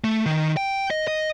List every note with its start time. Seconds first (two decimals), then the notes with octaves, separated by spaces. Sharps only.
0.04 A3
0.26 D#3
0.57 G5
0.91 D#5
1.07 D#5